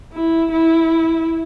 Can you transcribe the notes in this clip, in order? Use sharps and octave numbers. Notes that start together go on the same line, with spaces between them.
E4
E4